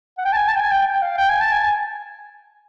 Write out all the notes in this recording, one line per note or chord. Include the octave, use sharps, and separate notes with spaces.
F#5
G5
A5
G#5
A5
G5
G#5
G5
G5
F5
G5
G#5
A5
G#5
G#5